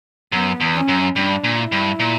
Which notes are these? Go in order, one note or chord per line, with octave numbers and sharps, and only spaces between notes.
F#2 B3
E2
C#4
F#2
G2 D4
A#2
E4
G2
A#2